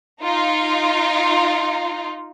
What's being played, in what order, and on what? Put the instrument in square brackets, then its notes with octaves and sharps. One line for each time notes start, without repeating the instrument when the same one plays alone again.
[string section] D#4 F4